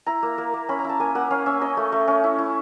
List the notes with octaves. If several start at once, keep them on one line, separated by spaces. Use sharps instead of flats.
E4 A#5
A#3
A#3
A#3
C#4 B5
A#5
E4
A5
A#3 G#5
A#3 F#5
C#4 F5
C#4 E5
C#4 D#5
A3
A3
C#4
E4
E4